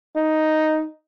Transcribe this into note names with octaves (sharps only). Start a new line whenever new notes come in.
D#4